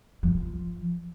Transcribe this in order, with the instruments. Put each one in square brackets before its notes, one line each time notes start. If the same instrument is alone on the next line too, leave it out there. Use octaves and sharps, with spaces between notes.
[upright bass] F3